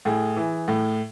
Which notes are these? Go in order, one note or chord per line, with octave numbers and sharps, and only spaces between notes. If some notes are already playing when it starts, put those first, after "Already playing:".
A2 G#4
E3
A2